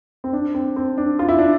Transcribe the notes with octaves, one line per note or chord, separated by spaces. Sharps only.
C4
D4
C4
C4
D4
F4
E4
D4